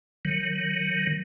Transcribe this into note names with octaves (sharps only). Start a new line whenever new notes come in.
D#3 F#3